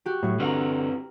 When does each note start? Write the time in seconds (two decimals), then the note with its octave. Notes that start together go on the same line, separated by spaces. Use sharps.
0.06 F#4 G4
0.23 A2 F#3
0.40 D3 C4 E4 F#4 B4 A#5 F6